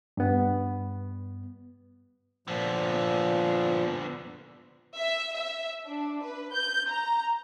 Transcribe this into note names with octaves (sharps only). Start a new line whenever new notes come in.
G2 B3
A#2 D3 F3 B3
E5
E5
D4
B4
G6
A#5